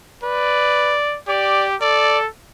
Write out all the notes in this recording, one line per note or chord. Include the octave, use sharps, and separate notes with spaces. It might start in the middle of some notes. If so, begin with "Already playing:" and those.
B4 D5
G4 D5
A4 D5